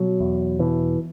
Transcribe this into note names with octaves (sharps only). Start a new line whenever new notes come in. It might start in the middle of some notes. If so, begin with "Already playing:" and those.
Already playing: B2 F#3
E2
B2 E3